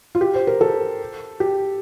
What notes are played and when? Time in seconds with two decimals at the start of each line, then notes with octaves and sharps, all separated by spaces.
0.15 F4
0.21 G4
0.34 C5
0.47 A#4
0.61 A4
1.40 G4